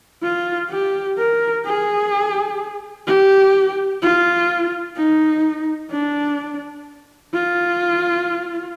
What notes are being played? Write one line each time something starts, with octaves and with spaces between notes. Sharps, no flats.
F4
G4
A#4
G#4
G4
F4
D#4
D4
F4